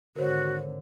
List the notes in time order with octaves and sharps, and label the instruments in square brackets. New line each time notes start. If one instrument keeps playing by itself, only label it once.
[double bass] G#1 D3 [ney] F#4 [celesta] A#4 C5 C#5